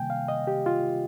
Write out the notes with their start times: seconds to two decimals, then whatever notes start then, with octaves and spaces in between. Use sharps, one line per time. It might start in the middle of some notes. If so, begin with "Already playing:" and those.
Already playing: C3 D#3 G3 A#3 G5 G#5
0.10 F5
0.28 D#5
0.47 G4
0.66 F4